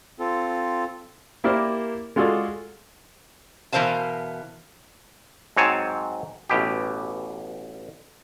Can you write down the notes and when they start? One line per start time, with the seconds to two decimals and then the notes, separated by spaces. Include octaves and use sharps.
0.19 C4 F4 A4
1.44 A#3 E4 G4 A#4 C5 D5
2.16 G#3 F4 F#4 G#4 A4 D5
3.72 B2 E3 A#4 C5 F5 A5
5.57 G#2 F#3 C4 C#5 G#5 A5
6.50 A1 B2 G4